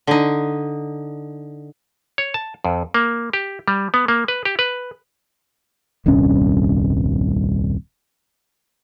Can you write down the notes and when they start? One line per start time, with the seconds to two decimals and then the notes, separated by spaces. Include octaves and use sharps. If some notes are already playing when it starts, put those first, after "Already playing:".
0.07 D3 D#4
2.18 C#5
2.34 A5
2.65 F2
2.94 A#3
3.33 G4
3.68 G3
3.94 B3
4.08 A#3
4.28 B4
4.45 G4
4.59 B4
6.06 D#1 C2 G2 C#4